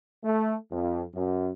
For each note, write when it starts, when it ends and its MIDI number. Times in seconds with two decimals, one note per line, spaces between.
0.23 0.55 57
0.71 1.03 41
1.14 1.50 42